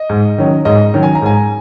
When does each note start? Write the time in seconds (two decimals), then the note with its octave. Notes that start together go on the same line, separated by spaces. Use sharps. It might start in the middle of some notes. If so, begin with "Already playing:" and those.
Already playing: D#5
0.10 G#2
0.38 D#3 F#3 C#4
0.65 G#2 D#5
0.94 D#3 F#3 C#4
1.03 G#5
1.15 A#5
1.22 G#2 G#5